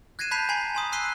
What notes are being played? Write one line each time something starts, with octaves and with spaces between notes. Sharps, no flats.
F#6 G#6 A#6 C7 D#7 E7
A5 B5 G6 B6 C7 F7
G#5 A#5 B5 G#6 C7 C#7
G#5 C6 D#6
E6 F#6 B6 C7 D#7 G7